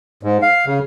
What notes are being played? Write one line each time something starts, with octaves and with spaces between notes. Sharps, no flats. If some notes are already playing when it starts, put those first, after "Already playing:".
G#2
F5
C#3